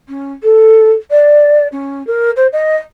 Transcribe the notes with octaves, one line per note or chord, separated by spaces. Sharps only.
C#4
A4
D5
C#4
A#4
C5
D#5